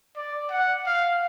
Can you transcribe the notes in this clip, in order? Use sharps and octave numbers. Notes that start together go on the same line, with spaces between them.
D5
F#5
F5